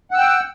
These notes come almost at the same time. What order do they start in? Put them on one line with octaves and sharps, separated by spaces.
F#5 E6 G5